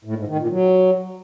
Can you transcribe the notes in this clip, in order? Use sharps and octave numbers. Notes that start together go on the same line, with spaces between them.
A2
G#2
D#3
A#2
F#3